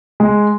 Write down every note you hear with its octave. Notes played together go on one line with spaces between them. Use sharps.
G#3